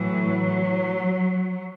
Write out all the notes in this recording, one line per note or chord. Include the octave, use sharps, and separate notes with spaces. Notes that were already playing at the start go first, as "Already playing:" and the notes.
Already playing: A2 E3 F#3